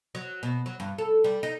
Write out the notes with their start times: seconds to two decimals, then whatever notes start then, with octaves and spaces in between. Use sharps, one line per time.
0.15 F#3
0.43 B2
0.66 F#3
0.80 G2
0.98 A4
1.24 G3
1.43 D#4